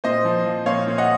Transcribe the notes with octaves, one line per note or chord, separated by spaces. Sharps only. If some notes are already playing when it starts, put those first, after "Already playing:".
A#2 C5 D#5
F3
F3
A#2 C#5 F5
A#2
D#5 F#5